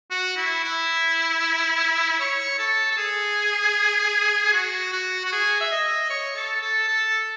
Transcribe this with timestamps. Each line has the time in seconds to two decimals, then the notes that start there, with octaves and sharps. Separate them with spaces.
0.11 F#4
0.37 E4
0.64 E4
2.20 C#5
2.59 A4
2.92 A4
2.98 G#4
4.53 F#4
4.93 F#4
5.25 F#4
5.32 G#4
5.61 E5
5.71 D#5
6.10 C#5
6.36 A4
6.62 A4
6.88 A4